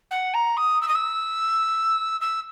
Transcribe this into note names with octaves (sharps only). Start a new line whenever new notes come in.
F#5
A#5
D#6
E6
D#6
E6
E6